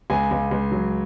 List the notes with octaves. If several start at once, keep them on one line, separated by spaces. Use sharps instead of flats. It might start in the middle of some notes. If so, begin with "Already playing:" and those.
C#2 G#5
C#2
C#2
F#3